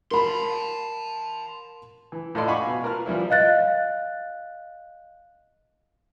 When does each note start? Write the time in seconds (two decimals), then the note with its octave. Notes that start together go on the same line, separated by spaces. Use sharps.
0.11 A#4 A5 B5 C6
2.12 E3
2.35 A2 F4 A4 D5 D#5 C6
2.47 F5 F#5 G#5 B5 C#6 D6
2.67 B2
2.83 F4 A#4 B4 A5 F6
3.06 E3 F3 G3 E4
3.30 D#5 F5 F#6 A6